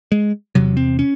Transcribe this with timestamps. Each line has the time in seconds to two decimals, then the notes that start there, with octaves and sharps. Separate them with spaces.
0.12 G#3
0.55 E2 C3 F#3
0.77 C4
0.99 C#4